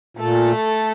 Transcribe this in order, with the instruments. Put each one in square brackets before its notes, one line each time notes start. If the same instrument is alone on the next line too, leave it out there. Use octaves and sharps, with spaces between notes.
[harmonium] A#2 [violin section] A3 A4